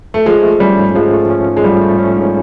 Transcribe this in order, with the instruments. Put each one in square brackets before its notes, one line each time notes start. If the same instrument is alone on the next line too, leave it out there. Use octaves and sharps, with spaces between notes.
[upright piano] A3
[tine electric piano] F3 [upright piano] G#3
[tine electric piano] A3
[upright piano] G3 [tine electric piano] C#4
[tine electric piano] G#2
[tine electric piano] F3 [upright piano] G#3
[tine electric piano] A3
C#4
G#2
[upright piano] G#3
[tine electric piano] F3 [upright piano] G3
[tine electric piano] A3
C#4
G#2